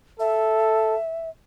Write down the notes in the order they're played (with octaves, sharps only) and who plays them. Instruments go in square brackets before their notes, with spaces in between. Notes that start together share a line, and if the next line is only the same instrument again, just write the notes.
[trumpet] A4 [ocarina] E5